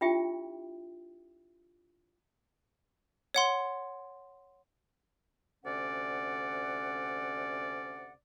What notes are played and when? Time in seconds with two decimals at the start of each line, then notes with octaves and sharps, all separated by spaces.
0.01 D4 E4 F4 G4 E5 G5
3.34 C#5 F#5 C6
5.64 D2 C3 C#4 D5 F#5